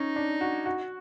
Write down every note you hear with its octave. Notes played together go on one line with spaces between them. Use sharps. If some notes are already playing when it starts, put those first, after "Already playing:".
Already playing: C#4 D#4
D4
F#4
F#4